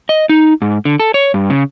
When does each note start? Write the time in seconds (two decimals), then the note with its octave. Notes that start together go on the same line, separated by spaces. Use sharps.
0.09 D#5
0.29 D#4
0.62 G#2
0.85 D3
1.00 A4
1.14 C#5
1.34 G2
1.50 C#3